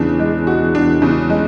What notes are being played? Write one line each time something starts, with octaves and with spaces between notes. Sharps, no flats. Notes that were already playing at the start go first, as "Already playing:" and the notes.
Already playing: E2 C#3 D4
G#3
F#4
D4
C#3
G#3